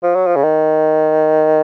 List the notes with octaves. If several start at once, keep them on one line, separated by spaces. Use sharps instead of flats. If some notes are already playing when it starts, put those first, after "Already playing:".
F3
F#3
F3
C#3
D#3